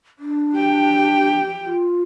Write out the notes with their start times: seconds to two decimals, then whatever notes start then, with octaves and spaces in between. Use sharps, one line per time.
0.19 D4
0.56 G4 G5
1.65 F4